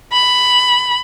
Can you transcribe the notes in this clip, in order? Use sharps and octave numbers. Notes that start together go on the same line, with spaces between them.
B5